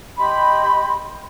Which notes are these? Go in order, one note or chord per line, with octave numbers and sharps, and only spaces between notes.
G4 D#5 B5 C6